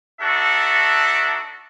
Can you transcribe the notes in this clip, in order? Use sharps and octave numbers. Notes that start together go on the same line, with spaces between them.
D4 D#4 F#4 A4 E5